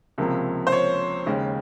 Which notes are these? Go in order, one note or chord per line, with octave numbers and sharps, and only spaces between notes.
C#2 C3 F3 A#3
C5
C#5
D#2 C#3 G#3